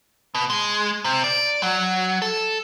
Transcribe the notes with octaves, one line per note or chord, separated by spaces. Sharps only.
B2
G#3
C3
D5
F#3
A4